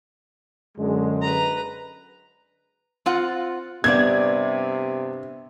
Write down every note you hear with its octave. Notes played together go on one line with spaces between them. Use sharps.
F#2 D3 G#3
B4 A#5
C4 F4 F#5
G2 C3 G3 B3 D4 D5 G#6